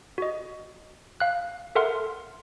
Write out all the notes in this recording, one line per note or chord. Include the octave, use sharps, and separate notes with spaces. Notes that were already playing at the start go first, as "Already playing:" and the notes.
F#4 D#5
F5 F#6
A4 A#4 E5 F#5 C6 F6